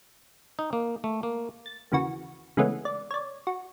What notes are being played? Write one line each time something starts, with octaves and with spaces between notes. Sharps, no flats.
D#4
A#3
A3
A#3
A6
D#2 C#3 E3 F#4
C#3 E3 G#3 A3 B3 C#4
D5
C#5 D5
F#4